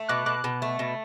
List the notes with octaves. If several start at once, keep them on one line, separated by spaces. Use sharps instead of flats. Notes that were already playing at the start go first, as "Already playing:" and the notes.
Already playing: A3
B2 D6 F#6
B2 D6 F#6
B2
A3
B2